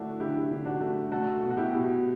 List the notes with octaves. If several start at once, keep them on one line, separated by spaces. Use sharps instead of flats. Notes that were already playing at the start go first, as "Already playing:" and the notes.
Already playing: D3 F#3 A3 D4 E4 F#4
D3 E4 G4
D3
D4 F#4
A3
A3 F#4 A4
B2
F#4
E4 G4
B2